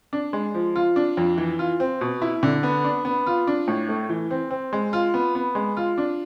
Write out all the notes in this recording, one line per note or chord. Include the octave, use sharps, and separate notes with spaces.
D4
G#3
F3
F4
D4
F2
E3
F4
C4
B2
E4
D3
B3
D4
B3
F4
D4
A2
A3
E3
C4
C4
G#3
F4
B3
B3
G#3
F4
D4